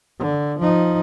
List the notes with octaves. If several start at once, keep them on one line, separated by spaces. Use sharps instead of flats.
D3
F3 D#4